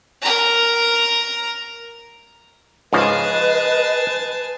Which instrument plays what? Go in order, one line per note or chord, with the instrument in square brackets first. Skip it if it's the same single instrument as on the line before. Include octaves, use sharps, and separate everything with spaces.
[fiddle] A#4 A#5
[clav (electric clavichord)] G#2 C#3 F3 [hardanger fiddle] G#4 A5 [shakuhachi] B4 [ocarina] D#5